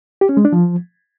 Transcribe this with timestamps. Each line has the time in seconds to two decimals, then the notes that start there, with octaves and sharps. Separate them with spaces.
0.21 G4
0.29 C#4
0.37 G#3
0.45 D4
0.53 F3